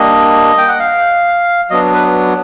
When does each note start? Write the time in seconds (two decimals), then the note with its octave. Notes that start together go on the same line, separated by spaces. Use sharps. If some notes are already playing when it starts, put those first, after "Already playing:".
Already playing: G3 A#3 D4 D#5
0.58 G5
0.68 F#5
0.79 F5
1.70 F#3 B3 D4 D#5
1.94 B4